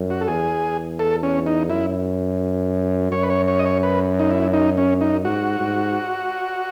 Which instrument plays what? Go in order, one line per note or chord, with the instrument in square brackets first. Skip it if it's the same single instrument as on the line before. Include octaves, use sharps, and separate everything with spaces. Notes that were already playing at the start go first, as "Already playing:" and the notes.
Already playing: [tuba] F#2
[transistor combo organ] F#4
A4
[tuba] E2 [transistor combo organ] G#4
[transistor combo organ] A4
C#4
D#4
[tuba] F#2 [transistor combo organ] E4
[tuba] F#2 [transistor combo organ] C#5
[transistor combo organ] B4
C#5
C#5
D#5
C#5
B4
D#4
E4
D#4
C#4
D#4
[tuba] G#2 [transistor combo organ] F#4
[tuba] G#2